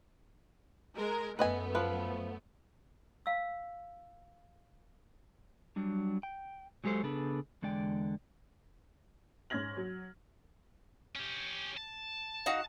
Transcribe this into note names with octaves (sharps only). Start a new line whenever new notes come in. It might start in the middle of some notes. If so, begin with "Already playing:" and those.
G#3 A#4
F#2 A3 B3 B4 D#5 G#5
F3 B4
F5 E6
F#3 G3 D4
G5
F#3 G#3 G4 A4 C5
C#3 B3 D4 G#4 A4 B4
E2 D3 G#3 D5 G5
G#2 C#4 F6 G#6 A#6 F#7
F#3
C#4 G4
A5
D#4 F#4 F5